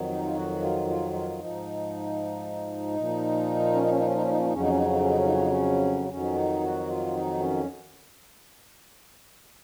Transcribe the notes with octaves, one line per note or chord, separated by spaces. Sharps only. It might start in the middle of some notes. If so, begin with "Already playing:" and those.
Already playing: F2 D#3 F#3
D#4
F4
F#4
F4
F4
F4
G#2 F3 D#4
A#2 F3
C#4
D#4
C#4
D#4
C#4
D#4
C#4
D#4
C#4
D#4
F2 C#3 F#3 C#4
D#4
C#4
D#4
C#4
D#4
C#4
D#4
C#4
D#4
C#4
D#4
C#4
F2 D#3 F#3 C#4
D#4
F#4
F4
D#4
C#4